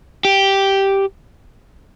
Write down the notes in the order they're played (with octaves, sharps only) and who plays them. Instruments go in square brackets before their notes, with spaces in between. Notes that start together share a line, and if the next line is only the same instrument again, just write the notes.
[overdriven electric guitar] G4